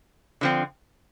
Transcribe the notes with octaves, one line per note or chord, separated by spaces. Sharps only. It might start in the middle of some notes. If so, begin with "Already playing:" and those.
D3 F3 C4